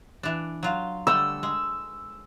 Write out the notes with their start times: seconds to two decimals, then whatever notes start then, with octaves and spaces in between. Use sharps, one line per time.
0.23 E3 D4
0.63 F#3 F4
1.07 D3 G3 A3 E6
1.43 G#3